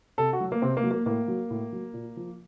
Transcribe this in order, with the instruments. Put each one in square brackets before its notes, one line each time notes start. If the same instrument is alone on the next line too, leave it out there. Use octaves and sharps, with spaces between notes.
[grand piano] C3 A4
F#4
F#3
A#3
C3 C4
A#3
F#3
A#3
A2 A#3
F#3
A2
F#3
A#2
F3